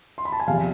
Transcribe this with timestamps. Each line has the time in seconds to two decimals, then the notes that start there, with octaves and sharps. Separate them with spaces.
0.18 C6
0.25 B5
0.32 A5
0.40 G#5
0.47 E2 C3 F3 F5